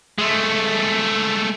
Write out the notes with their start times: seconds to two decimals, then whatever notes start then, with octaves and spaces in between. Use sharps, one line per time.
0.18 G#3 A3